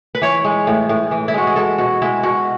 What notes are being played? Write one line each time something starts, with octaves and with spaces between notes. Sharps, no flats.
B4
E3 C#5
G#3
A2
A2
E3
E4
G#3 F#4
G#4
G#3 A4
B2 F#4
G#3 E4
B2 F#4